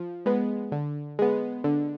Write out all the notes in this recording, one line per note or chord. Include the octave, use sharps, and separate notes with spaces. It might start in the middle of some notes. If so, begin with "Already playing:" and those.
Already playing: F3
G#3 B3
D3
G#3 B3
D3